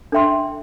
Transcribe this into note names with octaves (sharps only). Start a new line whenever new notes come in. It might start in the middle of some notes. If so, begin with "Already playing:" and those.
D4 A4 E5 G5 C6